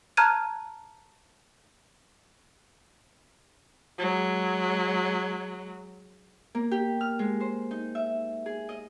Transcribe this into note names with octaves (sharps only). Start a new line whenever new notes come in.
A5 A#5 F6 F#6 G#6 D#7
F#3 G#3
A#3
G4
F6
G#3
C5
D#4
E5
G#4
D#5